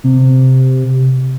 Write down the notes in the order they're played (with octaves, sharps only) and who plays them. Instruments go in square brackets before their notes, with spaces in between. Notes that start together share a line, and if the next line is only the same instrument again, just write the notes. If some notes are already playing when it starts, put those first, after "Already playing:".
[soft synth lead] C3